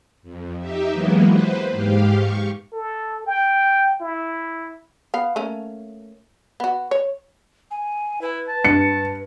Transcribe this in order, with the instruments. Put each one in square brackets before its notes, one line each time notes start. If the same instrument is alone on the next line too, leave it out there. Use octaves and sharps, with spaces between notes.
[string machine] F2
D#4 G4 E5
E3 F#3 G#3 A#3 B3
B4 C5
G#2 G4 F5
C#6
[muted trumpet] A4
G5
E4
[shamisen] B3 F5
A3 A#3 C#4
B3 F#4
C#5
[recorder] G#5
[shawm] E4 [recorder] B4
[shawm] A5
[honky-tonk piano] G2 [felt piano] C#7